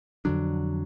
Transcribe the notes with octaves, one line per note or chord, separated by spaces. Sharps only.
F2 D3 F#3 D4